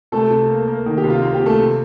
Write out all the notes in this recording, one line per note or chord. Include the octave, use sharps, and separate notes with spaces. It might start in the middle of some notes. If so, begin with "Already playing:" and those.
C3 A3 A4
C3
A#3
A#3
D#3
G4
C3
F4
A#3 F4
G4
C3
A3 A4
C3